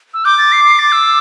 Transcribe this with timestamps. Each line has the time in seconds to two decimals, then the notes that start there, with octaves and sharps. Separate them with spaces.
0.14 E6
0.25 D6 G6
0.38 A6
0.52 C7
0.65 C7
0.79 A6
0.92 E6